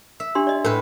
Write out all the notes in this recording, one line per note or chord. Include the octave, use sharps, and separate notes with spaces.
E5
D4 G4 C6
D5 D#5
A2 A#4 B4